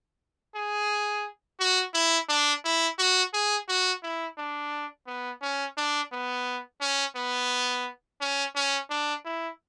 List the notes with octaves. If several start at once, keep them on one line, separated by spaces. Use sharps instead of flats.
G#4
F#4
E4
D4
E4
F#4
G#4
F#4
E4
D4
B3
C#4
D4
B3
C#4
B3
C#4
C#4
D4
E4